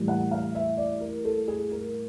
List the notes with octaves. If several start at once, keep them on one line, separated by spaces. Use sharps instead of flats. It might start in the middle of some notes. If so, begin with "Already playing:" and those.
Already playing: A2 E3 G3 A#3
F#5
F5
E5
D5
A#4
A4
G#4
A#4